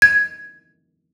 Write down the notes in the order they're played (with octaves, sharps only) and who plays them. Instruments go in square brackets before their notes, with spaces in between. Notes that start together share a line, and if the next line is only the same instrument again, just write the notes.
[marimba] G#6